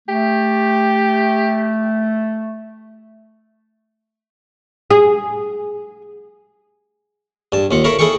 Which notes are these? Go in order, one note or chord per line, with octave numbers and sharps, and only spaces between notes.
A3 G4
G#4
G2 A5
D#2 F4 F#5
E4 A4 A#4 C#5 E5 F5
E4 G#4 A4 F5 G5 C#6